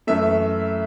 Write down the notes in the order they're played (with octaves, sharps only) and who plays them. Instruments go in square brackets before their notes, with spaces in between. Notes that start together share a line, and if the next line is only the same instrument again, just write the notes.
[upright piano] F#2 E3 A3 E5